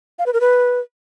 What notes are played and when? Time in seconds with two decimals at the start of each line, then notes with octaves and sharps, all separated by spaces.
0.19 F5
0.26 B4
0.33 A#4
0.41 B4